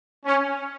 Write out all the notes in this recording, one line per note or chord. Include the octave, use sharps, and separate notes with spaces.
C#4